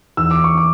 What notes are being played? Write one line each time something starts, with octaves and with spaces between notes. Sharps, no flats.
E2 E6
D6
C#6
D6